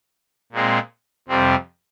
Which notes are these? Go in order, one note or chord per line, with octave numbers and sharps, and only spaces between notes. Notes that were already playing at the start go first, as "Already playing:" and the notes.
A#2 G#3 C4
F2 C3 G3 C4